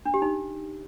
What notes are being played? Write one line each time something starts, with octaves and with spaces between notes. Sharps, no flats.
D4
G4
D#4